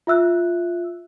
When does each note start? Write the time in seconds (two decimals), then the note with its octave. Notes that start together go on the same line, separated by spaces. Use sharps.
0.07 F4 E5 E6 F#6